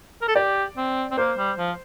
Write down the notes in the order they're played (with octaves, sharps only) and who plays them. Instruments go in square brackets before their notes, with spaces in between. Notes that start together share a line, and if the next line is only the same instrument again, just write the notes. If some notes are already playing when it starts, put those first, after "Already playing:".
[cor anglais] A#4
A4
[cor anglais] G4 [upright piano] D5
[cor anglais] C4
C4
[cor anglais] A#3 [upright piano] C5
[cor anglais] G3
F3